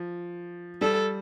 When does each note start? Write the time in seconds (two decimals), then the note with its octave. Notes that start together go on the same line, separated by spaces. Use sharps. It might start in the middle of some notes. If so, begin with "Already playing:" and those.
Already playing: F3
0.81 G3 A4